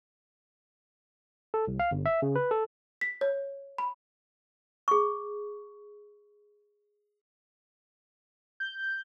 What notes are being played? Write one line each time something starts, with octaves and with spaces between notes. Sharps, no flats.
A4
C2
F5
G1
E5
C#3
B4
A4
B6
C#5
B5
G#4 C#6
G6